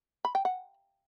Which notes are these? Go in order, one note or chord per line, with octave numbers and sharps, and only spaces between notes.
B5
G5
F#5